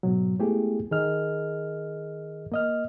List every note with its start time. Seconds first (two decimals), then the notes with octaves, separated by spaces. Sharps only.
0.03 G#2 B2 F#3
0.39 G#3 A3 B3 E4 G4 G#4
0.91 D#3 G#4 A#4 D#5 F6
2.52 A#3 D#5 F6